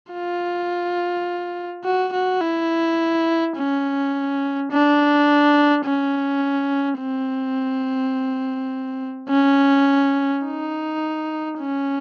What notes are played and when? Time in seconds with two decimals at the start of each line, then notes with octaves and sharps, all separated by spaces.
0.12 F4
1.84 F#4
2.13 F#4
2.41 E4
3.57 C#4
4.72 D4
5.85 C#4
7.00 C4
9.30 C#4
10.45 D#4
11.59 C#4